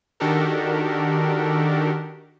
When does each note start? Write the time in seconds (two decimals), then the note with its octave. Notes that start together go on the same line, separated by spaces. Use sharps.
0.20 D#3 D4 F#4 G4 A4 A#4